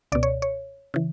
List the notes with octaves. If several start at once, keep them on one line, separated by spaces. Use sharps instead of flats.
C#2 B2 D5
C#5
C#5
C#3 E3